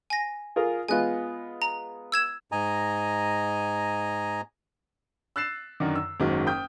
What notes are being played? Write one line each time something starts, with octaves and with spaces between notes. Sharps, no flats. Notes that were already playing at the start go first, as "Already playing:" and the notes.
G#5 A#6
F4 G#4 A#4
G#3 B3 F4 G#5 F#6
A#5
E6 G#6 E7
G#2 D#5 G#5 A#5
E6 F#6 A6 C7 E7
F#2 D3 D#3
E6
F#1 G#2 D#3 F#3
G5 D#6 F6 G6